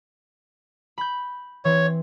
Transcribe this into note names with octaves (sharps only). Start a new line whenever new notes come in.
B5 G6
E3 C4 C#5